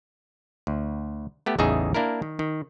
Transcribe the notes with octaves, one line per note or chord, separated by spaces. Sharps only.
D2
A3 B3 G4
A1 E2 C#3 D#4 G#4 E5
A#3 D4 E4 A#4
D#3
D#3